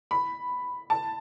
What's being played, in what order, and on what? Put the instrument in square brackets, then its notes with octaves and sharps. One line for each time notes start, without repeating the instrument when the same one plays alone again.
[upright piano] B5
A5